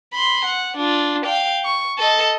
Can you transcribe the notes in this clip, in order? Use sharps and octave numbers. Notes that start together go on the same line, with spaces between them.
B5 C6
F#5
D4 F4
F5 G5
C#6
A4 D#5